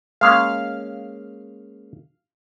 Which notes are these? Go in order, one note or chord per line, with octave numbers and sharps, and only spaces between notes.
G#3 A#3 C#4 F5 F6 C7